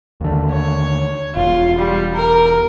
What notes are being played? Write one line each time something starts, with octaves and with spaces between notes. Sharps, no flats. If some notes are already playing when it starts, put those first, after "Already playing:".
D#2 D3
C#5
E1 E2 F4
G3
A#4